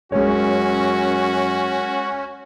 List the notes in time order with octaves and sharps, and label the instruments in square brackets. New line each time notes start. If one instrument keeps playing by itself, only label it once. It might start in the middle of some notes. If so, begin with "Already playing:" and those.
[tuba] F#2 [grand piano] G#3 C#5 [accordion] C#4 [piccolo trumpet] F#4